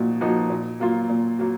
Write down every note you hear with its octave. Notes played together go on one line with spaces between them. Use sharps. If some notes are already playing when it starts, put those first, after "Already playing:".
Already playing: A#2 F3 A#3 D#4 F#4
F3 A#3 D#4 F#4
A#2
F#3 A#3 F4
A#2
F#3 A#3